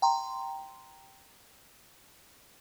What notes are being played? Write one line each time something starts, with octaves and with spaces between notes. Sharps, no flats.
G5 A#5 C6